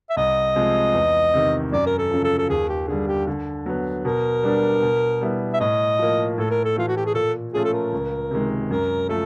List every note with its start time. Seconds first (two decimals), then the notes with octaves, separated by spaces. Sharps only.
0.10 E5
0.17 C2 D#5
0.56 C3 F3 G#3 C4
0.94 E2
1.34 C3 D#3
1.72 F#2 D5
1.86 A#4
1.98 A4
2.10 C#3 F3
2.24 A4
2.38 A4
2.50 D#2 G#4
2.69 G4
2.88 D3 G3 G#4
3.07 G4
3.27 D3
3.66 F#3 B3
4.05 B2 A#4
4.43 G3 B3 D4
4.82 B2
5.21 G3 B3 E4
5.54 E5
5.60 A2 D#5
5.99 F3 A#3
6.38 A2 A4
6.51 A#4
6.65 A4
6.76 E3 A3 F4
6.88 F#4
6.97 G4
7.06 G#4
7.15 A#2 A4
7.54 F3 A3 C#4 F4 G#4
7.64 A4
7.73 A#4
7.92 C#2
8.31 C3 D#3 G#3
8.70 F#2 A#4
9.09 F3 A3 A4